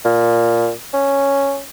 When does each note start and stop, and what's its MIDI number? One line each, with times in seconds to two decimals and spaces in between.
0.05 0.71 46
0.93 1.60 61